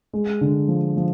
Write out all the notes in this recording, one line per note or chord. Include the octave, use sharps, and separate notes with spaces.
G#3
D3
F3
F3